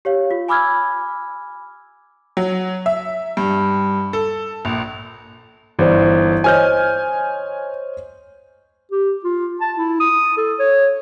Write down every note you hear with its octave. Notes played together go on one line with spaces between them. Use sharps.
G4 C#5 F5
F4
G#5 B5 D6 E6 F6 G#6
F#3
E5
G2
A4
A#1
G1 E3 C5 D5
C5 C#5 D#5 G#5 F6 G6
G4
F4
A5
E4
D#6
A4
C#5